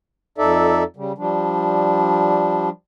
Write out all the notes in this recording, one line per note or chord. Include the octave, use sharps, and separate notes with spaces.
F2 D#4 A4 D5 E5
C#3 G3
F3 G3 D4